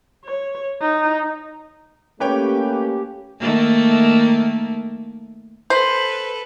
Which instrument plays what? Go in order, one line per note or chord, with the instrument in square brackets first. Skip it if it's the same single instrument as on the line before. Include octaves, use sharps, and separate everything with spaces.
[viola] C#5
D#4
[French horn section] A3 A#3 C#4 [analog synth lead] G4 [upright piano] B4 C#5 G5
[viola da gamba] D#3 A3 A#3
[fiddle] A4 B4 [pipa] C5